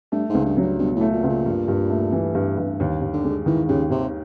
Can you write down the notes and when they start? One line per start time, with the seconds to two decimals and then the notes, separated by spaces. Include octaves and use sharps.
0.12 G2 A3
0.29 G#2
0.35 C#2
0.45 G2
0.57 F#3
0.62 G2
0.79 G2 B2
0.96 A2
1.01 A3
1.13 A#2
1.24 C#2 A#2
1.46 G2
1.68 G2
1.90 A3
2.12 E3
2.35 G2
2.58 G2
2.80 D#2
3.02 D#2
3.13 D3
3.25 G#3
3.46 D#3 E3
3.68 D#2 C#3
3.90 D#2 C3